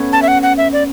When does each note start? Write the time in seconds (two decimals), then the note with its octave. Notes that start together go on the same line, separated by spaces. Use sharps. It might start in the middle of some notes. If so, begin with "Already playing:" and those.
Already playing: A3 B3 C#4
0.13 A5
0.22 E5
0.28 F#5
0.43 F#5
0.58 E5
0.73 D5